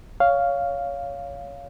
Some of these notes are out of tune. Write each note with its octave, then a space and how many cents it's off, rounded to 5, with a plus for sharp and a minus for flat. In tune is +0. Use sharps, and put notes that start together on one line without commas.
C#5 +20 F5 +0